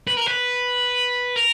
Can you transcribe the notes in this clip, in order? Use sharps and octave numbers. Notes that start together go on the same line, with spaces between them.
B4
A#4
B4
A#4